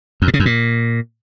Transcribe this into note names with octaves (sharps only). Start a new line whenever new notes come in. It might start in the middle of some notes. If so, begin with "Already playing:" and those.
F2
A2
C#3
F#2
A#2